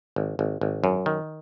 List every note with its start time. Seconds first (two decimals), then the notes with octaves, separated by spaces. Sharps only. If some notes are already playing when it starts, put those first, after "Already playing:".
0.16 G#1
0.39 G#1
0.61 G#1
0.84 F#2
1.06 D#3